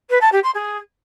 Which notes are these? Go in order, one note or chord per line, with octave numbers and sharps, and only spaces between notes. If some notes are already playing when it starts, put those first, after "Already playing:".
B4
A5
G4
C6
G#4